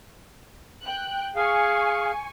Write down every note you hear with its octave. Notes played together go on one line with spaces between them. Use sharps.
G5 F#6
G#4 F5 G#5 C#6